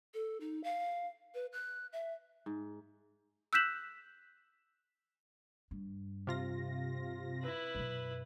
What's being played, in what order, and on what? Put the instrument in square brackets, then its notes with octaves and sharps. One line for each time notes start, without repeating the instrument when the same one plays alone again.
[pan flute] A4
D#4
F5
B4
F#6
E5
[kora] G#2
[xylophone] E6 F#6 G6 B6 E7 F#7
[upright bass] G2
[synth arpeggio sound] C3 F4 A#6
[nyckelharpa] E4 B4
[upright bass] F#2 B2